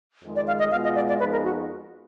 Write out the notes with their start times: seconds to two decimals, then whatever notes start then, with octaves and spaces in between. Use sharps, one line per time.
0.23 F2 D#3 G#3
0.36 D5
0.47 F5
0.59 D#5
0.71 B2 G#3 B3 F4 F5
0.84 D#5
0.95 D5
1.08 D5
1.19 F2 F3 G#3 B3 D#4 B4
1.32 A#4
1.44 F#4